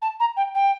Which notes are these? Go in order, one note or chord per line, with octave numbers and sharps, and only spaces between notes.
A5
A#5
G5
G5